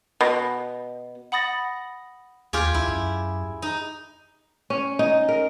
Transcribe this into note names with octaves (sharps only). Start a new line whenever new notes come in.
B2
F#5 B5 D#6 A6 A#6
D#2 F4 G4 G#4
C#2 E4
F#2
D#4
C#4
D#4
A#4